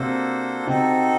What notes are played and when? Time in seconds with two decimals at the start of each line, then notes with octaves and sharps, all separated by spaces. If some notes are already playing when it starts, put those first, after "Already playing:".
Already playing: C3 A#3 D4 F#4 A4 C5
0.67 C3 C4 D#4 F#4 A4